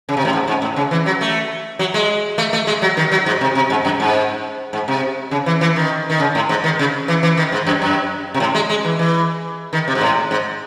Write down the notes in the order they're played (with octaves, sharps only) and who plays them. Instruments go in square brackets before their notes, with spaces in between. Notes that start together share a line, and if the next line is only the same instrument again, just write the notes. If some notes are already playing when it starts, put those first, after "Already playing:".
[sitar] C#3
C3
A2
G#2
G#2
A2
C#3
E3
F#3
A3
F#3
G#3
A3
A3
G#3
F#3
D#3
F#3
G#2
C3
C3
G#2
F#2
G#2
G#2
C3
C#3
E3
E3
D#3
D#3
C#3
A2
G#2
D#3
C#3
E3
E3
D#3
G#2
F#2
F#2
C3
A2
G#3
G#3
E3
E3
D#3
C3
G#2
A2
G#2